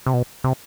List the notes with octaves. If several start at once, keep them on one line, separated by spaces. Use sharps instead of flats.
C3
B2
C3